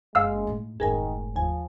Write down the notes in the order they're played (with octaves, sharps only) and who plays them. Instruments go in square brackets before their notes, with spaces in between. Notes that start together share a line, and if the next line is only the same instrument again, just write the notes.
[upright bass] F#1 [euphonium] G#3 [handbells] F5 E6 F6
[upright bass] A2 D#4
[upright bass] F1 G#2 [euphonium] D#3 [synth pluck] G#4 A#4 G#5
[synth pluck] D#2 G#5 [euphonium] F3